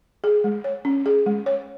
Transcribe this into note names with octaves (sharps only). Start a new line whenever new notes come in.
G#4
G#3
C#5
C#4
G#4
G#3
C#5